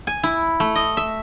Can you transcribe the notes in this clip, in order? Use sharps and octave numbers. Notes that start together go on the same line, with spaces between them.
G#5
E4
A3
D#5
E5